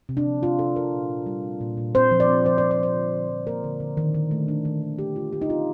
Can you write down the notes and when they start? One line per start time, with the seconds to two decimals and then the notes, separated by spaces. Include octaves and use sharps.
0.09 C3
0.17 D4
0.26 F3
0.42 A3 F4
0.59 C3 A4
0.76 C3 A#4
0.94 A#2
1.09 A#2
1.26 G3
1.43 C4
1.61 A#2
1.77 A#2
1.95 C4 C5
2.11 F3
2.20 D5
2.28 C4
2.45 F3 C5
2.58 D5
2.62 C4
2.71 D5
2.79 F3 C5
2.96 D3
3.13 D3
3.30 F3
3.47 A#3 A#4
3.64 D3
3.80 D3
3.97 D#3
4.14 D#3
4.31 A3
4.48 D4
4.65 D#3
4.82 D#3
4.99 D#3 G4
5.15 D#3 F4
5.33 A3 G4
5.42 D#4
5.50 C4 F4